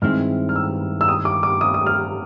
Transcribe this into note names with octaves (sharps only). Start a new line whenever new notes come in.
G2 D#3 G#3 C4 E4 F6
F6
E6
E6
D#6
D6
D6
D#6
D#6
F6